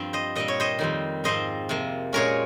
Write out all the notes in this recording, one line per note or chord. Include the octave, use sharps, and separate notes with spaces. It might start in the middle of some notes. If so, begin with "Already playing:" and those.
Already playing: G2 F3 C4
C5 D#5
A#2 G3 C4 D#5
C#5
C5 D#5
F2 D#3 G3 C4
G#2 F3 C4 C5 D#5
C3 F3 A#3
A#2 G#3 C#4 A#4 C#5